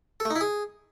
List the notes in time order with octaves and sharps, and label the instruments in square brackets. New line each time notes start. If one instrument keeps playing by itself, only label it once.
[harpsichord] A4
A3
D#4
E4
G#4